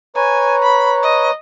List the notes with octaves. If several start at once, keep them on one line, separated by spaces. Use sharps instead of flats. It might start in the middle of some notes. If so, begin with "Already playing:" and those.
B4 C#5 G#5 A#5
B5
D#5